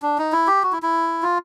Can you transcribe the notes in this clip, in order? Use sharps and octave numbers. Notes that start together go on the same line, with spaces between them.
D4
D#4
E4
G4
F#4
E4
E4
F4